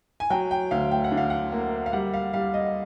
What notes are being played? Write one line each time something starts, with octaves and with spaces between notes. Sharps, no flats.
G#5
F#3 G5
G5
D2 F5
G5
F#5
D3
F5
F#5
A#3
F5
G3 F#5
F5
G3 F5
D#5